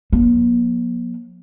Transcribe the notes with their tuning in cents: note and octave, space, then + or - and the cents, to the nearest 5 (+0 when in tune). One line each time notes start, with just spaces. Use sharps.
F3 +45 A#3 +40